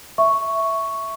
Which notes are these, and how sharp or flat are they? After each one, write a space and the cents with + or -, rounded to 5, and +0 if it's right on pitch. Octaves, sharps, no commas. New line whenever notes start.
E5 +0 C#6 +0